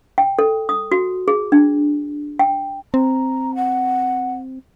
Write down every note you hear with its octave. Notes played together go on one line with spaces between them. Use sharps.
G5
A4
D#6
F#4
G#4
D4
G5
C4 A#5
F#5